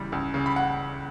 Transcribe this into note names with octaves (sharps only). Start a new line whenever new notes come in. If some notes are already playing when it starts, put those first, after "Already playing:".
Already playing: C#2 C#3 E3 G3
C#2
C#3
B5
F#5